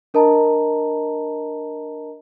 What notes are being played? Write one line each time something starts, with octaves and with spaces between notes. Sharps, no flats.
D4 A#4 D#5 A5 A#5